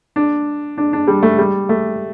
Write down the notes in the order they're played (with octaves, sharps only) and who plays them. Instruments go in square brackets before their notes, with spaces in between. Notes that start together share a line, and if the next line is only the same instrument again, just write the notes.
[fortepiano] D4
D4
D4
G3
A3
G3
A3